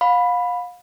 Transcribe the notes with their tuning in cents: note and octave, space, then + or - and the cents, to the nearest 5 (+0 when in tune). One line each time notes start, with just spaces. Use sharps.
F5 +35 B5 +0